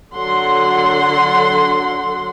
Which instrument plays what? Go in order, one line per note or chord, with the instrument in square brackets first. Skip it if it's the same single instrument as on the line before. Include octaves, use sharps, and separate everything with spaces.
[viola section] D3 F#3 F#5 C6